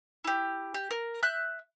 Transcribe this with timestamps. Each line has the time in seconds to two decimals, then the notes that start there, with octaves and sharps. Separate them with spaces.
0.24 E4 G4
0.74 G4
0.91 A#4
1.23 E5 F#6 G6